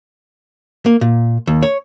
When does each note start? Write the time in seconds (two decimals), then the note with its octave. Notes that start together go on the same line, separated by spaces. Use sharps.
0.86 A#3
1.01 A#2
1.47 D#2
1.63 C#5